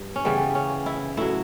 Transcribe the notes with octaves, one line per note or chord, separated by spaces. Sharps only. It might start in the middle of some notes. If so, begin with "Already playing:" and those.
Already playing: G2
C#4
C#3 E3 G3 B3
C#4
E4
A2 F#3 E4